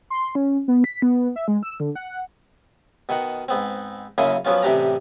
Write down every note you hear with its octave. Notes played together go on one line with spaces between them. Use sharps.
C6
C#4
B3
B6
B3
E5
G#3
E6
D3
F#5
B2 D#3 F#5
G#2 B3 C4
F#2 C#3 A#3 E4 C6 D#6
F3 F#3 B3 C#4 F4
A1 C3 E3 D4 G4 A#5